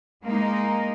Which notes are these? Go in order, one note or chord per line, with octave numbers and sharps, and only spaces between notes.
G#3 A#3 D#4